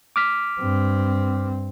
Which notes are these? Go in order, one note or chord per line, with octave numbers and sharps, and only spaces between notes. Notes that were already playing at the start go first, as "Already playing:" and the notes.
D6 F6 B6
G2 C4